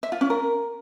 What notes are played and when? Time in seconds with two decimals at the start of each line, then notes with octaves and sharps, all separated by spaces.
0.03 E5
0.12 F4
0.21 C#4
0.30 A#4